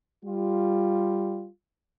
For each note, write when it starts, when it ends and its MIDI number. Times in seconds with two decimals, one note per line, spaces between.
0.24 1.48 55
0.24 1.48 65